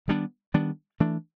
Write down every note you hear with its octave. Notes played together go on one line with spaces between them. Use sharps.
D#3 G3 B3 D4
D#3 G3 B3 D4
E3 A3 D4